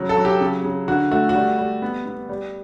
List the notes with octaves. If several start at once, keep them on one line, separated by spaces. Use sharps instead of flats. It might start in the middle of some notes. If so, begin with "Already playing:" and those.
Already playing: C#3 F#3
A4
F#3
G4
C#3
C#3
D3 F#4
A3 F#4
F#4
G3
G3
B3
B3
G3